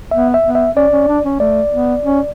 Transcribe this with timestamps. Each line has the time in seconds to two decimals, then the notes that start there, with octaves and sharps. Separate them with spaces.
0.11 B3 E5
0.34 E5
0.44 B3
0.55 E5
0.76 C#4 D5
0.92 C#4
1.08 D4
1.25 C#4
1.40 A3 D5
1.72 B3
2.05 C#4